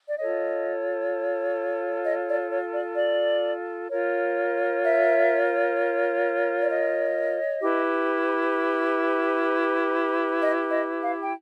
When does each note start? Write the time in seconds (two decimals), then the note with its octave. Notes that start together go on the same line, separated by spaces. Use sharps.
0.07 D5
0.17 F4 A4 C#5 D#5
2.04 D#5
2.27 D5
2.50 C#5
2.73 D5
2.96 D5
3.89 F4 A#4 C#5
4.82 E5
6.60 D5
6.68 D#5
7.61 E4 G4 B4
10.40 D#5
10.70 D#5
11.01 F5
11.22 G5